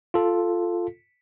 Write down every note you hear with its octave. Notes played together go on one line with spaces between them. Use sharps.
F4 A4